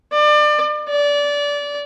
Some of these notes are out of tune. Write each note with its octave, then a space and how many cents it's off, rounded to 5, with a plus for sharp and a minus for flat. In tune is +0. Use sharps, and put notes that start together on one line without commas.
D5 +30
D5 -20